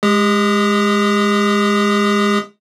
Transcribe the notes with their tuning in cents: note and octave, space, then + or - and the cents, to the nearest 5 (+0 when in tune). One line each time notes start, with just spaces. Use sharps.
G#3 +0 G4 +40 D#6 +0